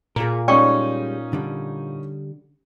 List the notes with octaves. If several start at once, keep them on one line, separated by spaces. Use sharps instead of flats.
A#2 G#4 A#4
G3 G#3 C#4 D#4 D5 G5 C#6
D3 G3